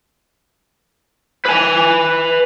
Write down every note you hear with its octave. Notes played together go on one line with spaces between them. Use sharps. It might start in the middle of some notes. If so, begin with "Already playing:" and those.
B4 G#5